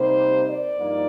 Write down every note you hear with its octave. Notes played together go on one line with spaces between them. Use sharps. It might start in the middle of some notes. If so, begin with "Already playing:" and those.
Already playing: C3 G3 A#3 D#4 C5
D5
G2 F3 A#3 D#4